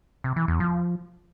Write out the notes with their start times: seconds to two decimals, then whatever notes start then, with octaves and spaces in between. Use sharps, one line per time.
0.24 C3
0.36 E3
0.48 E2
0.60 F3